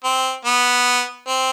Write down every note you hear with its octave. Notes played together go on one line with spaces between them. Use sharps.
C4
B3
C4